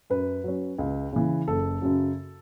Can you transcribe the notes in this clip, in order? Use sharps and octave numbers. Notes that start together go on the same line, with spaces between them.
F#2 B4
F#3 C#4
C#2
C#3 E3
F#1 A4
F#2 C#3 F#3